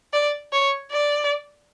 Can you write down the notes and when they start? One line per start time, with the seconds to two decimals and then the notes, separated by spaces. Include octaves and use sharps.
0.13 D5
0.53 C#5
0.92 D5